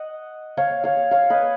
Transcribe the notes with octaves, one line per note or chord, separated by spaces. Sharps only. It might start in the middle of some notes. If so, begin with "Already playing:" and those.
Already playing: D#5 F#5
C#5 F5
C#5 F5
C#5 F5
B4 D#5